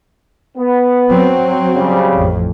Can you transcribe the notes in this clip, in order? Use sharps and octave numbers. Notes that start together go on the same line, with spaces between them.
B3
F#3 C4
C#3 G3
A1 F2